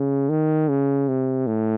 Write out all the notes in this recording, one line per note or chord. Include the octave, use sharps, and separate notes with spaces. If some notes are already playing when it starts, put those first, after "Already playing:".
Already playing: C#3
D#3
C#3
C3
A2